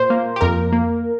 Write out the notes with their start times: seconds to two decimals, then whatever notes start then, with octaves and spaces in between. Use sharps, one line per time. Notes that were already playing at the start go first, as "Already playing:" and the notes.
Already playing: A#2 C5
0.10 A#3
0.36 G4
0.41 F2 A#4
0.72 A#3